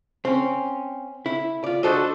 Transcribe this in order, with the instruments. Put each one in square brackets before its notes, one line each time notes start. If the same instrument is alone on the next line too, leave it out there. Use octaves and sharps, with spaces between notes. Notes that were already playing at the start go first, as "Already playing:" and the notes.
[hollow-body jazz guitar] C4 C#4
E4
F4 D5
A3 D4 F#4 A4 C5 D#5